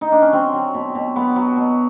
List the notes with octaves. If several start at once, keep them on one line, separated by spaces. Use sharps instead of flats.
D#4
D4
C#4
F#3 C4
F#3
B2
B2
F#3 B3
F#3
B2